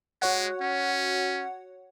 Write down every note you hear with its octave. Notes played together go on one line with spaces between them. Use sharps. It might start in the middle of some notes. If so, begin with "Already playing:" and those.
G#3 F#4 C#5 F#5
C#4